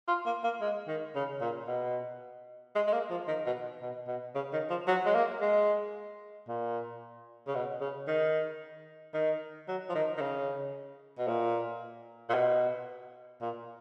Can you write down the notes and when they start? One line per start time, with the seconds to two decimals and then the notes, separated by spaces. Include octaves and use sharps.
0.08 F4
0.26 A#3
0.44 A#3
0.61 G#3
0.88 D#3
1.15 C#3
1.41 A#2
1.68 B2
2.76 G#3
2.87 G#3
2.93 A#3
3.11 F3
3.28 D#3
3.46 B2
3.82 B2
4.08 B2
4.35 C#3
4.53 D#3
4.70 F3
4.88 F#3
5.06 G#3
5.15 A#3
5.42 G#3
6.48 A#2
7.47 C#3
7.55 B2
7.81 C#3
8.08 D#3
9.14 D#3
9.68 F#3
9.89 F3
9.95 D#3
10.17 D#3
10.21 C#3
11.19 B2
11.28 A#2
12.30 A#2
12.35 B2
13.41 A#2